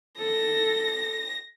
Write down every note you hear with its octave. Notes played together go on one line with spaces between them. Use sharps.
A4 A#6